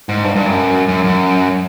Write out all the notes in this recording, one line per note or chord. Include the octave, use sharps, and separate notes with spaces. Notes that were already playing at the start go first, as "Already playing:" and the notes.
G#2
G2
G2
F#2
F#2
F#2